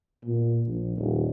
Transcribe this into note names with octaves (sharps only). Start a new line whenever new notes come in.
A#2
A#1
D#1